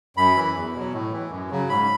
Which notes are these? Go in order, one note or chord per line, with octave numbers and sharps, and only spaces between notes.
F#2 B5
E3
E2
B2 F#3
A2
E3
F#2
C#3 F#3
G#2 B5